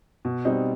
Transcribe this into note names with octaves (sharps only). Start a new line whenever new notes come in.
B2
G3 C4 D#4